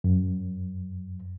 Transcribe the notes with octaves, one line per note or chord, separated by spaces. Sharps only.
F#2